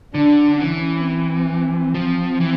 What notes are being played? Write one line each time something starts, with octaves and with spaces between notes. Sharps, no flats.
D3 D4
E3 C#4
C4
F3
E3